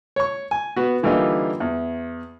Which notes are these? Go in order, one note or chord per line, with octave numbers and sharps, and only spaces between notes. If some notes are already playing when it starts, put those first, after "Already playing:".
C#5 C#6
G#5
B3 F#4
D3 E3 G3 A#3 D#4 F4
E2